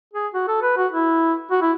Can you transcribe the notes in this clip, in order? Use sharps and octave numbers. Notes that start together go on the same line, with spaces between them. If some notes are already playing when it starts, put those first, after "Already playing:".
G#4
F#4
A4
B4
F#4
E4
F#4
E4